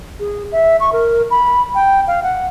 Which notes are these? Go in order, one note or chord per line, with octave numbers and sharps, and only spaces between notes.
G#4
E5
C#6
A#4
B5
G5
F5
F#5